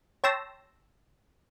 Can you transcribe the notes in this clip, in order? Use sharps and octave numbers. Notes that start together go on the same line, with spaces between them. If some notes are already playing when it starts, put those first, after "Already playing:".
C#5 G5 A5 C6 E6 A#6